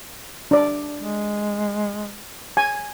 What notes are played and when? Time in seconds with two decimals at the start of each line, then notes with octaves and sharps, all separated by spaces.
0.51 D4 D5
0.98 G#3
2.57 G#5